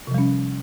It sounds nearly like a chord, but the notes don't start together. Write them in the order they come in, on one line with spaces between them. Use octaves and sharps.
C3 F3 G3 C#4